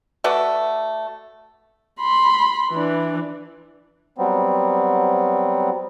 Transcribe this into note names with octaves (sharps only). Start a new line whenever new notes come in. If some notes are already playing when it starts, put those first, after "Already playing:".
A3 F#4 B4 D5
B5 C6
E3 D4
F#3 G3 B3 C4